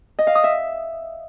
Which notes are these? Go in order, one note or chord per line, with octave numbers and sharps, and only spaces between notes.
D#5
F5
D#6
E5